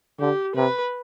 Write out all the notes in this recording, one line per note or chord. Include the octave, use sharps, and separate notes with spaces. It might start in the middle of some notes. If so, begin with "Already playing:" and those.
D3 G4
C3 B4